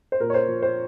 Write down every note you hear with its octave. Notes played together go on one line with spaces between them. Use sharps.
C5
A#2 A#4
C#5
C5
F3
C5